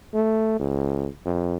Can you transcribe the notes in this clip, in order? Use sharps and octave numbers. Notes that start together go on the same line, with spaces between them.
A3
C#2
F2